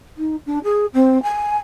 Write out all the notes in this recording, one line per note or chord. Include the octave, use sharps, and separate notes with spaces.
D#4
D4
G#4
C4
G#5